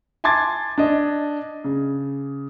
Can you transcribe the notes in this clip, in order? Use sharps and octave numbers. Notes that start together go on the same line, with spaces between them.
G#5 A5 C6 D6 G#6 A6
D4 D#5
C#3